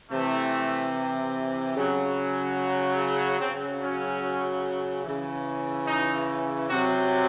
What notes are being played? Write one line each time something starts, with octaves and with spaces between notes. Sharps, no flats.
C3 E3 A3
C#3 F#3
C#3 F#3 C4
C#4
C#3 E3
D#4
C3 F#3 F#4